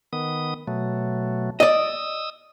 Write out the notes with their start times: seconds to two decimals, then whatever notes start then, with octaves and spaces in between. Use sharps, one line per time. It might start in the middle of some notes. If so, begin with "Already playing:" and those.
0.13 D#3 B3 D#6
0.68 B2 F#3 A3
1.60 D5 D#5 D#6 E6